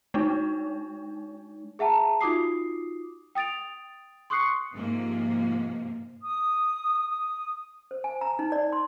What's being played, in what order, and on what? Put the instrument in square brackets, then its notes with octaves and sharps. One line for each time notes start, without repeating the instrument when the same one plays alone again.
[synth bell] G#3 D4 D#4
[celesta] G#4 E5 F#5 A5 A#5
D#4 F4 F#4 D6 D#6 C7
G5 D#6 A6 D7 F7
C6 C#6 D#6 F#6 C7 C#7
[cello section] G#2 C3 F3 A#3
[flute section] D#6
D#6
[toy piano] C5
G#5
A#5
D#4
D5
C6